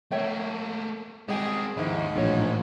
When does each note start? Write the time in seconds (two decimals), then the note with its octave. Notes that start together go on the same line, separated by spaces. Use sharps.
0.12 A3 A#3 C#5 E5 G5
1.28 G3 G#3 C4 G#4 G5
1.77 D#2 G#2 F3 D#4 E4
2.15 A#1 A2 E3 F4 C#5